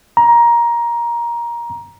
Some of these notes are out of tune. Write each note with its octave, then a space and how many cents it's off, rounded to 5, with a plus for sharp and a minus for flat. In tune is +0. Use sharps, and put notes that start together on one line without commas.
A#5 +15